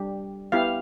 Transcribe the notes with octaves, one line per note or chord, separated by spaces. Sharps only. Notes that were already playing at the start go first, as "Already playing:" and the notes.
Already playing: G3 D4 G4
B3 E4 G4 F5